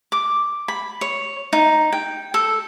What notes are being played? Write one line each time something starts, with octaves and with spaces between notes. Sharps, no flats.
D6
B5
C#5
D#4
G5
A4